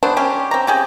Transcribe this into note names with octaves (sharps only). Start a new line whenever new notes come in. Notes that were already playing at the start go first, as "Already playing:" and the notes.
F#3 B3 D4 C5
C#4 G4
C4 A#5
C#3 G4 G#4